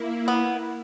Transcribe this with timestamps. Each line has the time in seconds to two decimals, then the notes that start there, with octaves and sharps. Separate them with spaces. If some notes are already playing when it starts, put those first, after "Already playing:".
Already playing: A#3 E4
0.28 B3